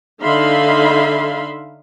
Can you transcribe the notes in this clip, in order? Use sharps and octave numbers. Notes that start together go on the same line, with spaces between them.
D3 D#4 E5 F5 B5 C6